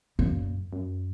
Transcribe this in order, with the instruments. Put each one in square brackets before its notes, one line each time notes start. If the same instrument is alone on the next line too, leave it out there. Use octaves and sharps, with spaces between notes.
[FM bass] F#2 [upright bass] A#2
[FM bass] F#2